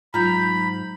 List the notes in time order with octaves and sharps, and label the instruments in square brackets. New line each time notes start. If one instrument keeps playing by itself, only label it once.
[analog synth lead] G#2 [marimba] F#3 F4 [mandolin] A#5 G6 [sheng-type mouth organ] B5